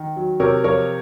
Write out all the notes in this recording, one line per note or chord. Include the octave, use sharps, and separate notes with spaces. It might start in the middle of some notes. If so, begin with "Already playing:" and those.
Already playing: D#3
F#3
C3 A#4 C#5
F3 A#4 C#5